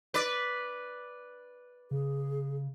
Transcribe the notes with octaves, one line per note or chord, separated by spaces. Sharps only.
B4 D5
C#3 G#4